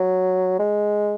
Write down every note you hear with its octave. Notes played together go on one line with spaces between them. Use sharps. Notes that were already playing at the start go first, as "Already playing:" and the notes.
Already playing: F#3
G#3